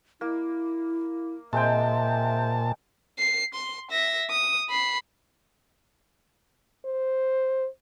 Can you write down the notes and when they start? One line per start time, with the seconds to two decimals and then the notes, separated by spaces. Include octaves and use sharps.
0.21 A#3 E4
1.53 A#2 G#3 C4 E5 G5 A5
3.19 C7
3.54 C6
3.91 E5 A#6
4.30 D#6
4.70 B5 C7
6.85 C5